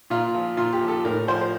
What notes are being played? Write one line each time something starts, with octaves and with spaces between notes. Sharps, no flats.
A#2 F4
F3
A#2 F4
G4
F3
A4
A2 A#4
F3 C5
C5